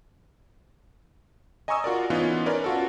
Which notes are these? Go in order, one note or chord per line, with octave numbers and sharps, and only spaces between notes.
D#5 G#5 A#5 C#6 D#6 E6
F4 F#4 A#4 D5
E3 B3 C#4 D#4 F4
C#4 A#4 B4 D5
F4 F#4 A4